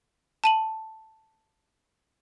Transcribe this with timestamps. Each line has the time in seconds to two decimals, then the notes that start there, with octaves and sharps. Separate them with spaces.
0.44 A5 D#7 F#7